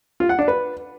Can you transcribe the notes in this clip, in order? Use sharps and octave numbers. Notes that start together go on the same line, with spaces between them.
F4
F#5
D4
B4